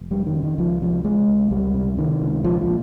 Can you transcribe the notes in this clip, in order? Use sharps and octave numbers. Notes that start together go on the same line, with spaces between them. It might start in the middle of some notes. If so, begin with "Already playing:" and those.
Already playing: F1
F2 G3
D#3
C#3
D#3
C#2 F3
C3 F3
C3 G#3
C#2
C#2 G3
C3
C3 D#3
C#2
A#1 F3
F3
A#2